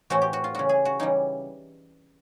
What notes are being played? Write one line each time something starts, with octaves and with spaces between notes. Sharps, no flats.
A2 E3 A3 C4 F#4
G4
F#4
F4
C#3 E3 G3 F#4
G#4
F#4
C#3 E3 G3 D#4